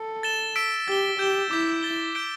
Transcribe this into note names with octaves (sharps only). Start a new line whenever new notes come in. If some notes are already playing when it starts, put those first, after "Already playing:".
Already playing: A4
A6 E7 G7
E6 B6 D7
G4 A6 G7
G4 G6 E7 G7
E4 D6 G6 B6
A6 G7
G6 B6 D7 G7